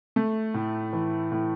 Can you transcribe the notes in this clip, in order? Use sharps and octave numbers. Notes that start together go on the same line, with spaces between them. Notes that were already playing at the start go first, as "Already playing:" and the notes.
A3
A2
E3
A2